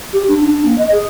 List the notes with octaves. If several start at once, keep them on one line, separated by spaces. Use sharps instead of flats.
G4
D4
D4
A#3
D#5
G#4